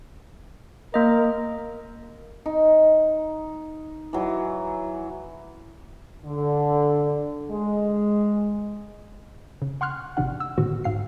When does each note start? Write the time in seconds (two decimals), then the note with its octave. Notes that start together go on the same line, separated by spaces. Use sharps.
0.94 A#3 A#4 D#5
2.46 D#4
4.13 E3 F#3
6.25 D3
7.51 G#3
9.62 C#3
9.81 F#5 C6 C#6 F6 F#6
10.17 G#1 C3 E3 D4 F#5
10.40 E6
10.58 A2 D3 D#3 B3 F#4
10.84 G#2 F5 C7